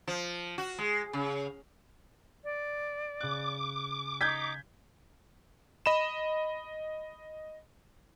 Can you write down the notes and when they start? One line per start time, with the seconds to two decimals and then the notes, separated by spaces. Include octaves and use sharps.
0.07 F3
0.58 F#4
0.78 G#3
1.13 C#3
2.44 D5
3.21 C#3 D6 F#6
4.21 D#4 G6 G#6 B6
5.86 D#5 B5 E7